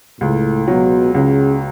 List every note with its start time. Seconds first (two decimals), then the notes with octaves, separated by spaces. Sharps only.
0.21 C#2 A2
0.67 B2 F#3
1.15 C#2 C#3